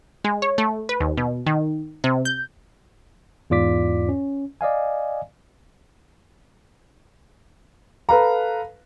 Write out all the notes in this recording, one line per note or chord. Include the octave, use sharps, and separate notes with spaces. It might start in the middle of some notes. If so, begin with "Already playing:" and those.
G#3
C#5
A3
B4
D#2
B2
D#3
C3
G6
E2 G#2 F4 D5 D6 B6
C#4
D5 D#5 F5 G#5
A4 B4 F5 A#5